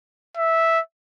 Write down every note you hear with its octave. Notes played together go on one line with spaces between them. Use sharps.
E5